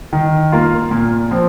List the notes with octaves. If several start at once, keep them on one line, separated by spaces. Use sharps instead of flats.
D#3
A#3 F4
A#2
F3 C4